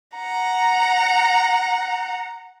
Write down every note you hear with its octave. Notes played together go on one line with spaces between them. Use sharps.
F#5 A#5